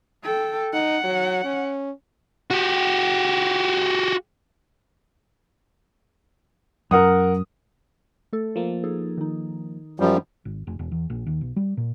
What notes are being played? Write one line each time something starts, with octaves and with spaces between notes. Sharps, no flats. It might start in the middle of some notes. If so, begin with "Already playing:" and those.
A4 G5
D#4 F#5
F#3
C#4
F#4 G4
F#2 A#4 F#5 D#6
A3 A4
F3 A#3
D#4 G#4 A4
D#3 D#4
F#2 F3 G3
G#1
F1
E1
E2
A#1
D#2
B1
G3
A#2